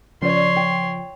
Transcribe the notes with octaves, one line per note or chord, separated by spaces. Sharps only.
C#3 F3 C#4 C#5 D5 C6
G5